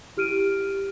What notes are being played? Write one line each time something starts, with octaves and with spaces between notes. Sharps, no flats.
E4 G4 F6 D7 D#7